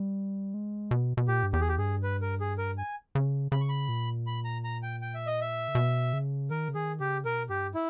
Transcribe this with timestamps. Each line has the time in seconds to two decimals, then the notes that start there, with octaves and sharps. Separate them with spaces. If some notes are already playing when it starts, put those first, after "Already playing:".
Already playing: G3
0.54 G#3
0.91 B2
1.17 B2
1.28 A#2 G4
1.43 G2
1.53 E2 G4
1.61 G#4
1.68 G4
1.78 G2 G#4
2.03 B4
2.21 A#4
2.40 G#4
2.58 A#4
2.78 G#5
3.15 C#3
3.52 C#3 B5
3.61 C#6
3.69 B5
3.89 A#2
4.27 B5
4.45 A#5
4.64 A#5
4.83 G5
5.02 G5
5.14 E5
5.27 D#5
5.41 E5
5.68 C#3
5.75 B2
6.13 C#3
6.51 D#3 A#4
6.68 C#3
6.75 D#3 G#4
7.00 C#3 G4
7.25 B2 A#4
7.49 G2 G4
7.74 E4